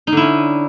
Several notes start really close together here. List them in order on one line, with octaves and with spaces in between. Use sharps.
D#4 D3 E4 C#4